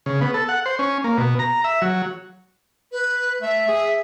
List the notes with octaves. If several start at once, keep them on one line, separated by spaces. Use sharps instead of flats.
C#3
B3
A4
F#5
C5
C#4
A#3
B2
A#5
E5
F#3
B4
A3 E5
G#4